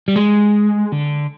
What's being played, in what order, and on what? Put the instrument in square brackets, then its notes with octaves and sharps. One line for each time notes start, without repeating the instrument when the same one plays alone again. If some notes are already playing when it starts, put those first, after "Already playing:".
[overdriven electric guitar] G3
G#3
D3